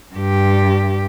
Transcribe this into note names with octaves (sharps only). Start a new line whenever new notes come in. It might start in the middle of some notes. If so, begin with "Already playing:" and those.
G2 G4